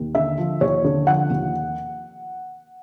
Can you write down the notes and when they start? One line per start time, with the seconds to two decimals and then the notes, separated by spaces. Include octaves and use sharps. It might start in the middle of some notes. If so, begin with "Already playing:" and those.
Already playing: D#2
0.15 D3 E5
0.38 F3
0.61 D#2 C#5
0.84 D3
1.07 F3 F#5
1.30 D#2